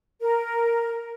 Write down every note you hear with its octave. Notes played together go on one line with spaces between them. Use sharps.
A#4